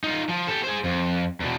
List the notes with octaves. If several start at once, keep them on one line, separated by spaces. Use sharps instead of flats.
D#4 F4
F3
G4 A4
G#4 C5
F2
E2 B2